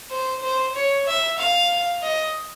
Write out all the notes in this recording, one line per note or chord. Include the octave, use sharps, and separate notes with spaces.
C5
C5
C#5
E5
F5
D#5